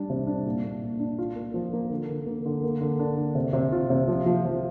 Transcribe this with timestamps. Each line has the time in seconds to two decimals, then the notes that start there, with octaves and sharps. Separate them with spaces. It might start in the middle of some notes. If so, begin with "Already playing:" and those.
Already playing: G3 D4
0.10 C3
0.27 D4
0.46 A#2
0.64 A#2
0.82 A#2
1.00 D4
1.18 F4
1.36 A#3
1.54 F3
1.73 A#3
1.90 D3
2.09 D3
2.26 A#3
2.46 D3
2.63 A#3
2.81 D3
2.99 D4
3.17 D3
3.35 C3
3.53 C3
3.72 F4
3.90 C3
4.08 F3
4.26 F3
4.45 F3